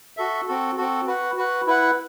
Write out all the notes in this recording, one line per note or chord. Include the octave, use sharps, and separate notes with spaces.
F#4 A4 E5
C4 F#4 A4
C4 F#4 A4
F#4 B4 F#5
F#4 B4 F#5
E4 B4 F#5